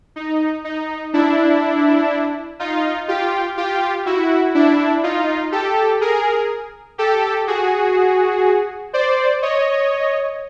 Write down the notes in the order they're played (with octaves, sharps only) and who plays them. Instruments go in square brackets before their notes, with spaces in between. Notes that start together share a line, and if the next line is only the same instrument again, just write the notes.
[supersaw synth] D#4
D#4
D4 E4
D#4 F4
F4 G4
F4 G4
E4 F#4
D4 E4
D#4 F4
G4 A4
G#4 A#4
G4 A4
F#4 G#4
C5 D5
C#5 D#5